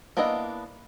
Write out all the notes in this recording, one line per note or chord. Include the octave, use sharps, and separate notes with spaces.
A#3 B3 D4 E4 D#5